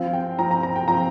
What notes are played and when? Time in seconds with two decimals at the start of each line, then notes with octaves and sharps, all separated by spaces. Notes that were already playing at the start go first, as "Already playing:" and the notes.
Already playing: F3 C4 F5
0.13 G5
0.39 F3 C4 A#5
0.51 A#5
0.63 A#5
0.76 G5
0.88 F3 C4 A#5